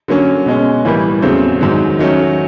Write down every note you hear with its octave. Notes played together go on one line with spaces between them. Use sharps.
D3 F#3 A#3 C#4
B2 G#3 C#4
A2 E3 G3 A#3
E2 C#3 F#3 A3 C4
G#2 D#3 F#3
D#3 F#3 A3 C#4